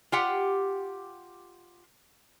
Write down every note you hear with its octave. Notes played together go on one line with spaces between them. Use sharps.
F4 G4 F#5